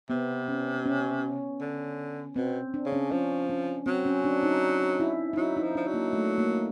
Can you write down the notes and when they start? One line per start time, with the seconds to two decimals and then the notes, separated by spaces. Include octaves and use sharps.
0.10 C3 B3
0.48 C#4
0.86 C#4
1.61 D3
2.36 B2 C4
2.74 D4
2.86 C#3
2.92 C#4
3.12 F3 C#4
3.49 C#4
3.86 F#3 C4
4.06 C#4
4.24 D4
4.43 D#4
5.00 E4
5.33 D#4
5.37 F#3 E4
5.57 D#4
5.63 F3
5.75 F3 D4
5.88 F#3
5.94 A#3
6.13 A3
6.38 A#3